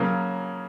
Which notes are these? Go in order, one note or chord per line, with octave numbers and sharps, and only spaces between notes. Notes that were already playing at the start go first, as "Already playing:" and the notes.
Already playing: C#3 F#3 A#3 C#4